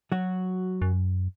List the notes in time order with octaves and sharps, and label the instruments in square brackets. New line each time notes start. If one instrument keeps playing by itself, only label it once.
[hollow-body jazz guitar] F#3 F#4
[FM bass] F#2